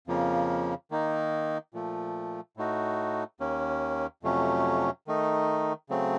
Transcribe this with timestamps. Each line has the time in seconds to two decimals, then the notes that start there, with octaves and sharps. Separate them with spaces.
0.07 F2 C#3 F3 A#3
0.91 D#3 A#3 D#4
1.74 A#2 F3 A3
2.57 A2 A3 D#4 F#4
3.40 D#2 D#3 A#3 C#4
4.23 F2 C3 F#3 A3 C#4
5.07 D#3 A3 D#4
5.89 C#3 F#3 A3 C4